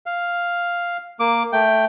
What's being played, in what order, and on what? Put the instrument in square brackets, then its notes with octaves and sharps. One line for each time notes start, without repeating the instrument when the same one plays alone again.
[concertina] F5
A#3 D6
A3 G5